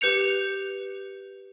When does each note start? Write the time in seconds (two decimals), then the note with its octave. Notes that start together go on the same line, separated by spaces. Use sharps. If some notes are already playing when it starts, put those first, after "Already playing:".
0.01 G4 B4 G6 C#7 F7